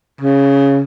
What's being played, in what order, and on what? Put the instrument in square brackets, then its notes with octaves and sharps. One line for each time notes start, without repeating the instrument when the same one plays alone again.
[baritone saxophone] C#3